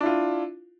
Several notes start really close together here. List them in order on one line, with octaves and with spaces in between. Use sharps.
D4 E4 F4